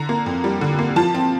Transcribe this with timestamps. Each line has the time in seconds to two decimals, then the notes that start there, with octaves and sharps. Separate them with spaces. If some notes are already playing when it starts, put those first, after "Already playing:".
Already playing: D3 A#5
0.09 A#3
0.26 F2
0.44 G3
0.61 D3
0.79 A#3
0.96 F3 A5
1.14 C4